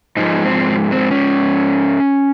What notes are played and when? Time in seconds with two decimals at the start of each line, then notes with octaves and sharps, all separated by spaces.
0.17 G#2 F3 G#3 D#4
0.45 C4
0.92 C4
1.11 C#4